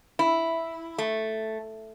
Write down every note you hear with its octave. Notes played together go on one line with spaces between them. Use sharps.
E4
A3